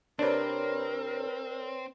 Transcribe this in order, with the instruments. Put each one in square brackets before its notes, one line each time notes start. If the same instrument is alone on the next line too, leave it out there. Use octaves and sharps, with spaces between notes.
[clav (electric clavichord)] C3 D4 [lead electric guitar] C4 [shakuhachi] A#4 [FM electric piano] B4 C#5 D5